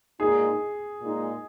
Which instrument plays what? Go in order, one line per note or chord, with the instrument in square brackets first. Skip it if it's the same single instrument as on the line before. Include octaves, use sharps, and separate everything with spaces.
[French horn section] A#2 G#3 D#4 [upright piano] G#4
[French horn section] A#2 G#3 D#4